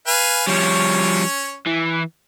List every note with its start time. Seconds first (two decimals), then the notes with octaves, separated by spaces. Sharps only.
0.07 B4 F5 G#5
0.47 F3 G3 C#4 C#5
1.67 E3